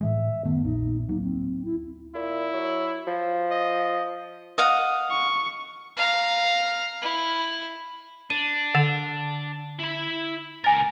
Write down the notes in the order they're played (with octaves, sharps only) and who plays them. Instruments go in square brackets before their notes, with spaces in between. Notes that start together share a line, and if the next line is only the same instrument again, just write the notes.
[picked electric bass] A2 E3 G#3 [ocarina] E5
[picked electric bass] F#2 D#3 A3 [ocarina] B3
[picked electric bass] A#1 F2 A#2 [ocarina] D#4
[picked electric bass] D1 F#3 A#3 [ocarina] D#4
[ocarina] C4
E4
[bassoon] A#2 [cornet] E4
[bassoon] F#3
F3
[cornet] D#5
[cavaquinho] D#5 F5 F#5
[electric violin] C#6
[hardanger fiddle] F5 A#5
E4
[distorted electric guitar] D4 [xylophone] D#7
[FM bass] D3 [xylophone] A6 E7 F7
[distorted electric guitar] E4 B5
[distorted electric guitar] C#2 A#4 [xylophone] G#5 A6